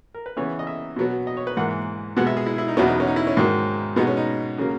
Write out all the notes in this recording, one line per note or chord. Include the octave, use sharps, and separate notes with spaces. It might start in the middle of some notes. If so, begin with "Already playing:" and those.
A#4
B4
C#3 E3 B3 C#5
D#5
E5
B2 F#3 B3
D#5
C#5
B4
G#2 E3 A#3 F#5
B2 G#3 B3 F#5
E5
G#4
E4
E4
D#4
E2 B2 F#3 B3 C#4
D#4
C#4
D#4
E4
C#4
G#2 D#3 F#3
B2 G#3 B3 D#4
C#4
D#4
C#3 F#3 A#3